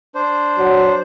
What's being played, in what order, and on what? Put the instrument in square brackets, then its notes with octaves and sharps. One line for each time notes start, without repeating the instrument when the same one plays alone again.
[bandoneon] D4 C5
[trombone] F#3